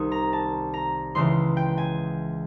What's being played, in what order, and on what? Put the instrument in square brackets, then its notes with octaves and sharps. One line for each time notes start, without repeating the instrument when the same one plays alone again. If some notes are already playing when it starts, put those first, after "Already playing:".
Already playing: [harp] C2 C3 D#3 C#6
A#5
A5
A#5
C#2 C#3 E3 C6
G5
G#5